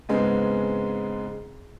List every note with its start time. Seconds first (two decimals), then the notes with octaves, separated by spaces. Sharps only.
0.09 G#2 C#3 G#3 B3 C4